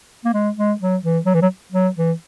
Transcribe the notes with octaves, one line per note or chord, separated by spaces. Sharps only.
A#3
G#3
G#3
F#3
E3
F#3
E3
F#3
F#3
E3